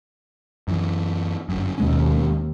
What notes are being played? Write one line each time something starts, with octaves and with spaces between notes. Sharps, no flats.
F#2 E3
G1 F#2
D#2 B2 G#3 C#4